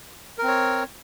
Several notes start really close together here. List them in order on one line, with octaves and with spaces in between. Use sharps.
A#4 C4 C#5